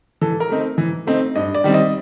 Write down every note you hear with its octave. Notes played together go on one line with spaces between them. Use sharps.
E3 A4
A#4
A3 C4 D#4
E3
A3 C4 D#4
G2 D#5
D5
D#3 G3 C4
D#5